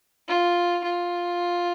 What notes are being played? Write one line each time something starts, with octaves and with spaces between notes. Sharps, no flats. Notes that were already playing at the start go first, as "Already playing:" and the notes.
F4
F4